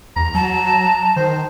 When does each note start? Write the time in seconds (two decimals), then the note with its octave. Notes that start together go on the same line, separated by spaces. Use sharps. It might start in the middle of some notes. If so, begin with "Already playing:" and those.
0.16 E2 A#5
0.35 F#3 A5
1.16 D#3 C5